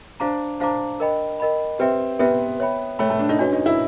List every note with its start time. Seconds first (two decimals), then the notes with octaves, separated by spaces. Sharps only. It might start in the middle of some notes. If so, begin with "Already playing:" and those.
0.20 D4 C5 F5 A#5 D6
0.60 D4 C5 F5 A#5 D6
1.00 A#4 D#5 G5 B5
1.40 A#4 D#5 G5 B5
1.79 C4 G4 B4 E5 G5
2.19 B3 G4 B4 E5 G5
2.60 C#5 E5 G5 B5
2.99 A3 C#5 E5 G5 B5
3.10 A3
3.19 D4
3.29 D#4
3.39 C#4 D4 F#4 B4
3.53 D#4
3.66 E4